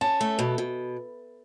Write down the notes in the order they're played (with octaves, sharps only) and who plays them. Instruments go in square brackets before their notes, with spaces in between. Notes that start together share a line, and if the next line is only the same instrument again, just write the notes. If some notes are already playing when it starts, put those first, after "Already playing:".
[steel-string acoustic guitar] C#4 [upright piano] A5
[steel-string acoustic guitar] A3
B2
B2